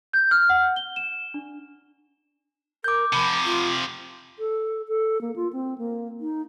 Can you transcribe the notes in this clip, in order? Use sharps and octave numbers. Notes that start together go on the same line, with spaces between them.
G6
F6
F#5
G7
E7
D4
A#4 D6 G6
C3 F3 B5
F4
A4
A4
A#3
F4
C4
A#3
D#4